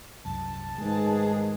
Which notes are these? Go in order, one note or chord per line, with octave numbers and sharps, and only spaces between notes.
C2 F#2 A5
G#2 D#3 G#3 A3 G#4 B4